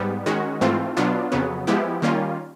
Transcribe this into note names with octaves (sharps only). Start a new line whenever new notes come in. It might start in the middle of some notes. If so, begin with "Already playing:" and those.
Already playing: G#2 G3 B3
D#3 G#3 C#4 F#4
G#2 E3 A3 C4 F4
B2 F#3 B3 D4 F4
F2 C#3 F#3 B3
F3 G#3 B3 E4 G4
D#3 G3 A#3 C#4 F4